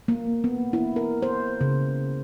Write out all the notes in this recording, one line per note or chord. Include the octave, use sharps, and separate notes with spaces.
A#3
B3
E4
A#4
C5
C#3